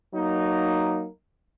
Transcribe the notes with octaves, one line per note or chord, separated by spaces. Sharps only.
F#3 A#3 D#4